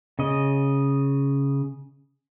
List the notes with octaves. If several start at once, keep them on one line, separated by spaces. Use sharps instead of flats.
C#3 D#5